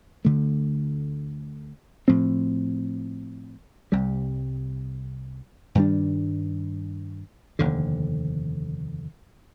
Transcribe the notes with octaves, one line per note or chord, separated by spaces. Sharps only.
D2 D3 A3
A2 F3 C4
C2 C3 G3
G2 D#3 G3 D4
F1 D#2 D3